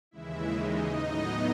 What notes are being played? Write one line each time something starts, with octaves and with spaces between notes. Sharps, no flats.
D#2 C#3 E3 G#3 E4 E5
D#4 D#5
A2 F#3 B3